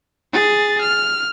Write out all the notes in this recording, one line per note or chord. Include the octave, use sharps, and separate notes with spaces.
G#4 A6
F6